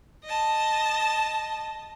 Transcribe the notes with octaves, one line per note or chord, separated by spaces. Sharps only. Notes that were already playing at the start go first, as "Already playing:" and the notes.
D#5 A5